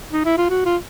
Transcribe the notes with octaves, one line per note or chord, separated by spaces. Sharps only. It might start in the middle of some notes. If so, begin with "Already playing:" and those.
D#4
E4
F4
F#4
F4